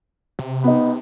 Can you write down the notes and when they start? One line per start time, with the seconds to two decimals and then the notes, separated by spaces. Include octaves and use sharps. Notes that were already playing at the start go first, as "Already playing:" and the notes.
0.39 C3
0.64 B3 D#4